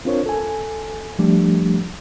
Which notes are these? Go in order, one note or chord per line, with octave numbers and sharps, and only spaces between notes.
C4 D4 F4 A#4 C5 C#5
A4 G#5
F3 G3 A3 D4 G4